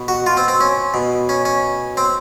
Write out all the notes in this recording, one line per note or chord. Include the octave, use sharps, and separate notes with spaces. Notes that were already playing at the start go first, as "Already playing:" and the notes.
Already playing: B2
F#4
F4
C4
C4
C#4
B2
C#4
C#4
C4